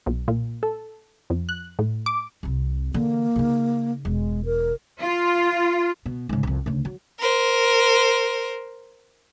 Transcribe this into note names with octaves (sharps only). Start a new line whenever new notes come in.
B1
A#2
A4
F2
F#6
A2
D6
C2 C3
D3 E3 A#3
C#3 D#4
E1 G#3
A#4
F4
B2
G#2 C#3
C2 F2
D2 C#3
F#3
A#4 C5